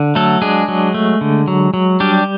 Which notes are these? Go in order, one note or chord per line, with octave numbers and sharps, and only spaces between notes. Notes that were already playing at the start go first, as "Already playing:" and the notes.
Already playing: D3
F#3 A3 A4
G#3 D4 G#4
F#3
A3
D3
F#3
F#3
G3 D4 G4